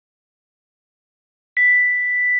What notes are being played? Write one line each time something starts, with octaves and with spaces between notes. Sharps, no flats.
B6